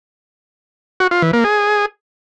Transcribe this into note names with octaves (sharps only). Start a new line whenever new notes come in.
F#4
F4
E3
A#3
G#4